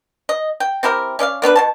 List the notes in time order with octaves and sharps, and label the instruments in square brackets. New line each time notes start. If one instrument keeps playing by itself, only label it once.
[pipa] D#5
G5
C4 E4 G4 A#4
C#4 D5 E5 F5
A#3 B3 D4 B4
B2 F3 A5